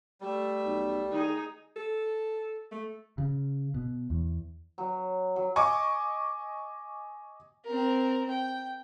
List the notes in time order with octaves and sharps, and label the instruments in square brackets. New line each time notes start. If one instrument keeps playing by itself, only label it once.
[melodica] G3 [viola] A3 E5
[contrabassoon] B1
[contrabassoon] D#3 [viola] D#4 G#4
[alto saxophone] A4
A3
[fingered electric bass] C#3
B2
E2
[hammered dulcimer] F#3
F#3
[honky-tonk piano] D#5 G#5 C#6 D6
[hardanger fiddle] C4 A#4
G5